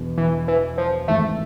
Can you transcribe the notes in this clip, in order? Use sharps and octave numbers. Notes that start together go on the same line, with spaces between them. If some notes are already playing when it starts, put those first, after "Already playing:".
Already playing: E1 E2 B2
E3
E3
F3
G#1 G#2 E3 A3